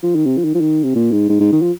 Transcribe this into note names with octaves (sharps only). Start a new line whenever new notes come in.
F3
D#3
C3
F3
D#3
F3
D#3
C3
A#2
G#2
G#2
G#2
D#3
F3